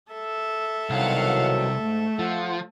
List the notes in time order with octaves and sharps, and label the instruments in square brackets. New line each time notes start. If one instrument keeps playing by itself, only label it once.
[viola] A4 E5
[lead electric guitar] C2 [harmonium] B2 D#3 F#3 [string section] F5 F#5
[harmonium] G#2 [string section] A3
[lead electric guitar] F3 [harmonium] F4 F#5